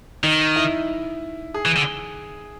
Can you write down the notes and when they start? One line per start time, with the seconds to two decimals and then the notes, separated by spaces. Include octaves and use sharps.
0.24 D#3 D#4
0.56 E4
1.54 G#4
1.66 E3
1.77 D3